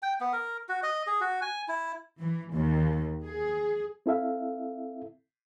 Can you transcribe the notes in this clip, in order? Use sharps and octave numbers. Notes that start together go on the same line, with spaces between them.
G5
B3
A#4
F#4
D#5
G#4
F#4
G#5
E4
E3
D#2
G#4
C4 E4 A4 E5 F5